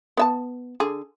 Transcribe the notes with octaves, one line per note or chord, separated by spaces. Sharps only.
B3 E5 A5
D3 G#4